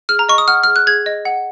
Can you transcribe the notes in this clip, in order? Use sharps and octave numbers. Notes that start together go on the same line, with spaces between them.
G#4 F6
A#5
D#5 C#6
D#6
F#5 F6
G#4 F6
F#6
G#4 G#6
D#5
F#5